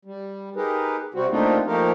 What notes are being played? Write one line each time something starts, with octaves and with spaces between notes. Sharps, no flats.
G3
D#4 G4 G#4 A#4 B4
C3 G3 C4 F#4
A3 A#3 C4 D4 D#4 F4
F3 A3 A#3 D#4 G4 A#4